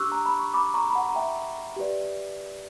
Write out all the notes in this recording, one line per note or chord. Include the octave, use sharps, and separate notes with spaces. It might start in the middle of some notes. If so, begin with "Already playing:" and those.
Already playing: D4 G4 C#6 D6 E6 F#6
A#5
B5
C#6
B5 D6
A#5 C#6
B5
F#5 A#5
A#5
E5 G5
G4 B4 D5